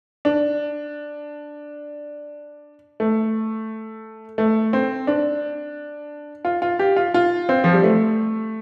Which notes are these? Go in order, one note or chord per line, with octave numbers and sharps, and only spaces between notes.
D4
A3
A3
C4
D4
F4
F4
G4
F4
F4
C4
F3
G3
A3